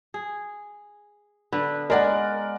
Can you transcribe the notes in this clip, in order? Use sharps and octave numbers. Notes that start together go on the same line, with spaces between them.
G#4
D3 B3 B4
G#3 A#4 D5 F#5